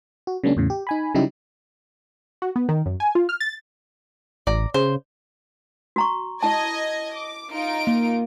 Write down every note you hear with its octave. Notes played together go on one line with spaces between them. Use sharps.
F#4
C#3 F#3 G#3 A#3 C#4 D4
E2 A2 C#3
G4
D#4 G#5 B5
C#3 F#3 G3 D#4 E4 G4
F#4
B3
D#3
F#2
G#5
F4
F6
A6
A1 D5 A#5
C#3 C5
F#4 A#5 C#6
E4 D#5 A5 G#6
D6
D#4 F4 D7
A#3